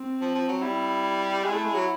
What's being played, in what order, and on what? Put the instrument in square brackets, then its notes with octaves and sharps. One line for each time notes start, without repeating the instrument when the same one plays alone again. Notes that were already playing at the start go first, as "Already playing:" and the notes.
Already playing: [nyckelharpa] C4
[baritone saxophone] F3
F3
F#3
[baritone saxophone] G3 [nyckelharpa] E4
[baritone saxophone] G#3 [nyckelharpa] E4
[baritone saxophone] A3
G#3
F#3